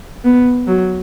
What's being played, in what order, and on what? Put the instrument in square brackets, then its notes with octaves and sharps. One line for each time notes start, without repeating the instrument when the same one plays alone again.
[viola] B3
F#3